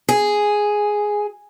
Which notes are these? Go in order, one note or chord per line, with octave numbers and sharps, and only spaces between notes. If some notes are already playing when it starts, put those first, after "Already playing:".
G#4